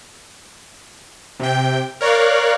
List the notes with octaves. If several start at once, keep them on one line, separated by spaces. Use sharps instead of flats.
C3 G5
A#4 C#5 D5 F5 F#6